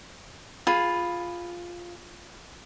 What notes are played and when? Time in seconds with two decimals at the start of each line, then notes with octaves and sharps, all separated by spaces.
0.67 F4 G#4 B5